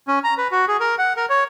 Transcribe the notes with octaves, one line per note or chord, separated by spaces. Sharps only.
C#4
A#5
B4
F#4
G#4
A#4
F#5
A#4
C#5